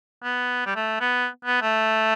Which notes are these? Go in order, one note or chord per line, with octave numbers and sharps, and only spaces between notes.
B3
G3
A3
B3
B3
A3